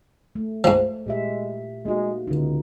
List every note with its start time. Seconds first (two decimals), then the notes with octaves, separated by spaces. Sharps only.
0.35 A3
0.64 G#2 F3
1.06 A#2 G#3 G4 E5
1.85 G#3 A#3 D#4 F#4
2.27 C#2 D3 D#4